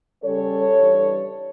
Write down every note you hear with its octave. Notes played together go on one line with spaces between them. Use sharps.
C#3 G3 C#4 A4 C#5
E3 G3 D4